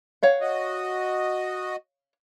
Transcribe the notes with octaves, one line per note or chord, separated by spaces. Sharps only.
C#5 F5 F#5
F#4 D#5